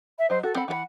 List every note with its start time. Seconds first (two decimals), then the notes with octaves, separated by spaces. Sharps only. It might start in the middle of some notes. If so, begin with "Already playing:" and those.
0.18 E5
0.30 F#3 C5 D#5
0.43 F#4 A4
0.55 C4 A4 F#5 B5
0.68 E3 F#4 F#5 B5